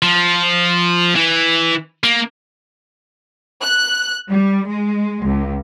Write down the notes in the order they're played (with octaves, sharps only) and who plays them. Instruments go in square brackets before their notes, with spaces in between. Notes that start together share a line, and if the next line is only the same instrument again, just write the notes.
[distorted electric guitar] F3
E3
A#3
[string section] F#6
G3
G#3
C#2